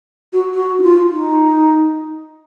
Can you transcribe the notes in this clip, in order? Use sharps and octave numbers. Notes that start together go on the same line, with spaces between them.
F#4
F#4
D#4
F4
D#4